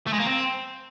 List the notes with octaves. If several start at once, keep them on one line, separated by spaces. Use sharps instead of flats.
A3
G#3
A#3
C4